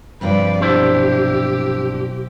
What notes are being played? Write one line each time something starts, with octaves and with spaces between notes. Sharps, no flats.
G2 C3 F3 B4 D5
B1 D4 E4 G4 C5